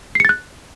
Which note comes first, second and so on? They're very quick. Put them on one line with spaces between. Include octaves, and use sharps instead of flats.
C7 C#7 A6 F#6